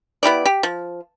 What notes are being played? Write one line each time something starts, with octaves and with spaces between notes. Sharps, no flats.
B3 E4 G4 D5
G4
F3